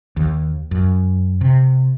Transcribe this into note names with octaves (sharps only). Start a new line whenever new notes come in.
D#2
F#2
C3